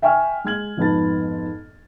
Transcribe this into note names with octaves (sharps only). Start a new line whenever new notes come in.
E5 G5 G#5 C#6 F6
G#3 F6 G#6 F#7
F2 G#2 B3 A5 A6